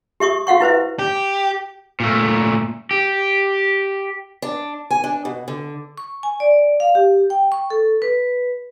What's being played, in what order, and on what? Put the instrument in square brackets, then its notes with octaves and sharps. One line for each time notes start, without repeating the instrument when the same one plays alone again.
[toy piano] G4 E5 C#6 D#6
F#4 F5 F#5 C#6
E4 B4 C5 E5
[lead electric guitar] G4
[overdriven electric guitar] A#2 A3
G4
[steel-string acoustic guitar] D4
G#5
D4
B2
D3
[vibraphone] C#6
G#5
D5
F5
G4
G5
C#6
A4
B4